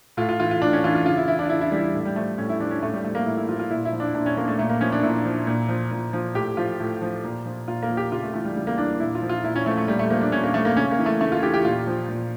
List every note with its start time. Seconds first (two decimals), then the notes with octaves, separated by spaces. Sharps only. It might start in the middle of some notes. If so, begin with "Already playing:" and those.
0.17 A2 F4
0.29 F4
0.40 E3 F4
0.51 F4
0.62 A2 D4
0.73 C#4
0.84 E3 F4
0.95 F4
1.06 C#3 F4
1.17 E4
1.28 E3 E4
1.39 D4
1.50 C#3 E4
1.61 E4
1.72 E3 G3
1.94 A2
2.05 G3
2.16 F3 A3
2.38 A2 C#4
2.49 E4
2.60 F3 D4
2.71 C#4
2.82 A2 A3
2.93 G3
3.04 F3 A3
3.15 A#3
3.26 A2 E4
3.38 E4
3.49 F3 F4
3.60 F4
3.70 A#2 E4
3.85 E4
3.93 F3
4.00 D4
4.15 A#2 D4
4.26 C#4
4.37 F3 A#3
4.48 A3
4.59 A#2 A3
4.69 A#3
4.81 F3 C#4
4.92 D4
5.03 A#2 E4
5.25 F3
5.47 A#2
5.69 F3
5.91 A#2
6.13 F3
6.35 A2 G4
6.57 F3 F4
6.80 A2
7.02 F3
7.24 A#2
7.46 F3
7.68 A#2 F4
7.83 A#3
7.90 F3
7.97 G4
8.12 C#3 F4
8.23 A3
8.34 E3 A3
8.45 G3
8.56 C#3 G3
8.67 A#3
8.78 E3 D4
9.00 A#2 E4
9.15 F4
9.22 F3
9.29 F4
9.44 A#2 E4
9.56 C#4
9.66 F3 A3
9.77 A3
9.88 A#2 G3
9.99 A3
10.10 F3 A#3
10.21 D4
10.32 A#2 C#4
10.44 A#3
10.54 F3 A3
10.65 A#3
10.76 C#3 C#4
10.91 A#3
10.98 E3
11.06 A3
11.21 C#3 A3
11.32 F4
11.43 E3 G4
11.54 G4
11.65 A#2 F4
11.87 F3
12.09 A#2